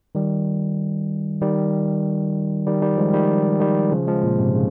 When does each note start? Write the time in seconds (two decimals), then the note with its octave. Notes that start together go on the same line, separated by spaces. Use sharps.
0.15 D#3 G3
1.41 D#3 G3
2.67 D#3 G3
2.82 D#3 G3
2.97 F3 G#3
3.13 D#3 G3
3.60 D#3 G3
3.92 C#3 F3
4.07 F3 G#3
4.23 A#2
4.39 G#2 C3
4.55 C#3